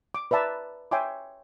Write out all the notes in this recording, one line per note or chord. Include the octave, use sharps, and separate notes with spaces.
D6
B4 D5 E5 A5 A#5
C#5 E5 G5 G#5 C6 D6